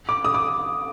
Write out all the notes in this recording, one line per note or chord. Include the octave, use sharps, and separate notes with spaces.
D6
D#6
D6